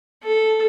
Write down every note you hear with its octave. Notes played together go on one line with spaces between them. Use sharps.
A4